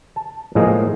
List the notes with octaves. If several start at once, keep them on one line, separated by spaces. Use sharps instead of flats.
A5
A2 F3 G#3 A#3 G#4 D#5